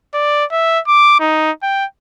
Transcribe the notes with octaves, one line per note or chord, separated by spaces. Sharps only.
D5
E5
D6
D#4
G5